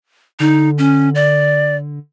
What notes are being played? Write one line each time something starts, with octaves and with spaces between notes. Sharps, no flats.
D3 D#4
C#4
D5